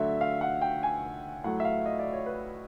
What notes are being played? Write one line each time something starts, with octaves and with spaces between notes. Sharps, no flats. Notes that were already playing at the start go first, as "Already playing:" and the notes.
Already playing: D3 F#3 A3 E5
F5
F#5
G5
G#5
A2 F#3 A3 F#5
E5
F5
D#5
D5
C#5
B4